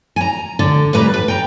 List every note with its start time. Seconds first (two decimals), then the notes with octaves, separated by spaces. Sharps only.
0.16 G#5 A#5
0.59 D3
0.93 A2 G3 B4 A#5
1.14 B4
1.28 G5 A#5